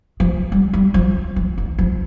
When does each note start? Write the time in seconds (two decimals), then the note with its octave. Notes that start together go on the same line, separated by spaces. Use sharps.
0.20 F3
0.52 G3
0.74 G3
0.94 F3
1.36 F3
1.58 D#3
1.79 F3